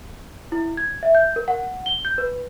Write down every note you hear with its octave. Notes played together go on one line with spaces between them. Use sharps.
E4
G#6
E5
G6
A#4
F#5
G7
G6
B4